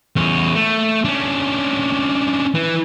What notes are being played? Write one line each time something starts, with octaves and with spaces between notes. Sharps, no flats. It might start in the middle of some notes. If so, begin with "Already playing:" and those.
E2 C#4
A3
C#4 D4
E3